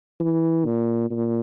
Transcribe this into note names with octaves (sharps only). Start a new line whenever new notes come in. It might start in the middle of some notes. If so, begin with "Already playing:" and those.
E3
A#2
A#2